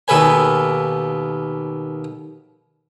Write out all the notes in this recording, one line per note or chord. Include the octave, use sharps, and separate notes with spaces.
D#2 B2 A4 B4 G#5